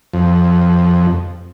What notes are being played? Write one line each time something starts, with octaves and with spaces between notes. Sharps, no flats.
F2